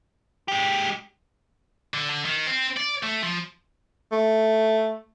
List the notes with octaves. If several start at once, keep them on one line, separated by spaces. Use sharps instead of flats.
G#3 G4
D3
D3
D#3
C4
D5
A3
F3
A3